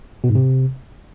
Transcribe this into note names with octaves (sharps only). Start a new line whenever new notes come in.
B2
G#2
C3